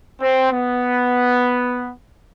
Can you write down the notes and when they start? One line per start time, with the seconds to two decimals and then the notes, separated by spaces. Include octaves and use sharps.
0.21 C4
0.52 B3